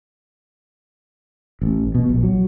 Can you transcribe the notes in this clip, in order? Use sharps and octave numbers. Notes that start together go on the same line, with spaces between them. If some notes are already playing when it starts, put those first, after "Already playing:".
A1
B2
A#1
F#3